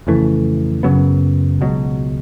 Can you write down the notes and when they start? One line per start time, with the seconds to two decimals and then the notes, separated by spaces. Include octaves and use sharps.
0.07 F2 C#3 E3 A3
0.83 F#2 C#3 F#3 B3
1.61 C#2 B2 F#3